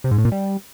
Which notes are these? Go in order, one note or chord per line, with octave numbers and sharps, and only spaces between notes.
C3
G#2
A2
A#2
G3